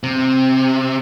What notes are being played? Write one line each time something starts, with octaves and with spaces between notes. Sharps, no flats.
C3